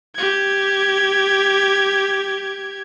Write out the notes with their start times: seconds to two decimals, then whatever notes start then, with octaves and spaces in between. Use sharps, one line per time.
0.15 G4 G#6